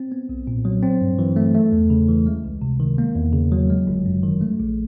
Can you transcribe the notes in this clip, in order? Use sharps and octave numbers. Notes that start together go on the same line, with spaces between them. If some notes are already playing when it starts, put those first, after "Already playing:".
Already playing: C4
B3
B1
A#2
F#3
C4
G2
E3
A3
A3
E2
C#3
E3
G#3
C#2
C3
D#3
A#3
E2
C#3
F#3
G#3
G1
F#2
D#3
A3
A#1